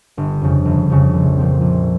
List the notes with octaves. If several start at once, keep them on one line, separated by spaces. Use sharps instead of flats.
G1
F2 C#3
G1
F2 C#3
A#1
A#2 F3 C4
A#1